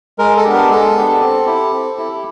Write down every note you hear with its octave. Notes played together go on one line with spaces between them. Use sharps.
G#3 A#4
A4
B3 D4 G4
A#4
G#3 A4
B3 D4 G4
C4
E4 G4
C4
E4 G4